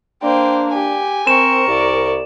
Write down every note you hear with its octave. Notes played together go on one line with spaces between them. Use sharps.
A#3 D4 C5 G5
G4 G#5
C4 A#4 C#6 E7
C2 D5